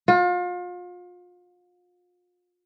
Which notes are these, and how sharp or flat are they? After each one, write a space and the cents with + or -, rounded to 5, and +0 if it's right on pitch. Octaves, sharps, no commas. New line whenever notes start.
F4 +35